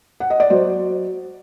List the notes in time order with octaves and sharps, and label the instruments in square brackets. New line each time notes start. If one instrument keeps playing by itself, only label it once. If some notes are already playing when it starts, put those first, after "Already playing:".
[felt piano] F#5
D#5
D5
F#3 C5